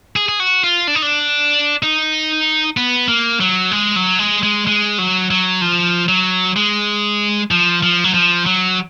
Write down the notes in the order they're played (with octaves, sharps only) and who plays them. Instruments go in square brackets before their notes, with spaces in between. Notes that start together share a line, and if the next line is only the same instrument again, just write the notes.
[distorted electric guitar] G#4
G#4
F#4
F4
D4
D#4
D4
D#4
B3
A#3
F#3
G#3
F#3
G#3
G#3
G#3
F#3
F#3
F3
F#3
G#3
F3
F3
F#3
F3
F#3